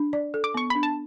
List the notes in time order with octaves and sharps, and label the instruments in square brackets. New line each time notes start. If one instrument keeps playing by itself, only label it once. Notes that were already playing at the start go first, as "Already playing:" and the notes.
Already playing: [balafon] D4
D5
A4
[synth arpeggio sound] D6
[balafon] B3 [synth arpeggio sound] C#6
[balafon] D4 [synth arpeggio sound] B5
[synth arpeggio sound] A5